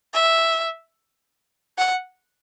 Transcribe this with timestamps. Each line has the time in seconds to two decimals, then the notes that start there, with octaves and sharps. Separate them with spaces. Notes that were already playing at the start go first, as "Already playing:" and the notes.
0.14 E5
1.78 F#5